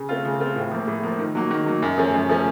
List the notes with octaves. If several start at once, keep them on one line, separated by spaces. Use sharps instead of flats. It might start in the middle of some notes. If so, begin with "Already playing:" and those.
Already playing: C#3
A3 C4 F4
C#3
A3 C4 F4
A2
F3 A#3
A2
F3 A#3
D#3
F#3 A#3
D#3
F#3 A#3
F#2
F3 A3 C#4
F#2
F3 A3 C#4